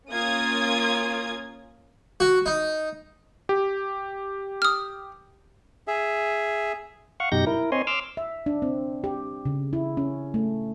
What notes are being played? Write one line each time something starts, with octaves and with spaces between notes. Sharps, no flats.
A#3 C#4 F4 D#6 G#6
F#4
D#4
G4
D#6 F6
G#4 E5
F5 F#5 C#6
F#2 B2 D#4 G4 G6 A#6
E4 A#4
C4 C#5 D#5 G#5 C6
C6 D6 E6 F6
E5
D4
C4
G4
C#3
E4
C#4
A3